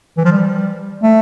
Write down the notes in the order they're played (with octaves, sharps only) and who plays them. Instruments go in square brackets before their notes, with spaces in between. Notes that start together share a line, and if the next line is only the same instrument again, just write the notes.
[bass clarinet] E3
F3
G3
A3